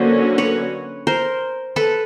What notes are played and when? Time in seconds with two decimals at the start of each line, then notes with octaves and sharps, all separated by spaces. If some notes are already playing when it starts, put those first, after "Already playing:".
Already playing: D3 F#3 A#3 C#4 F#4 C5
0.38 B4 C#5
1.07 A#4 C5
1.76 A4 B4